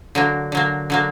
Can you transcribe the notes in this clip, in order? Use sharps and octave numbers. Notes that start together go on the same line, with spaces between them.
D3 F#3 A#3
D3 F#3 A#3
D3 F#3 A#3